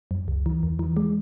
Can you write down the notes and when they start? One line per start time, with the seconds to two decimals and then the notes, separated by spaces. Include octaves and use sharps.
0.11 F#2
0.28 C#2
0.46 E3
0.63 E2
0.79 E3
0.97 G#3